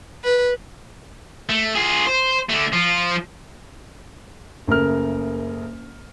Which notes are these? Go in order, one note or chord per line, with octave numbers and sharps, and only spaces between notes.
B4
A3
F4 G#4
C5
D3 A3
F3 F4
F#1 C#3 A3 A#4 F6